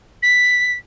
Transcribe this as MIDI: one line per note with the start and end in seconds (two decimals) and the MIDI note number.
0.22 0.74 95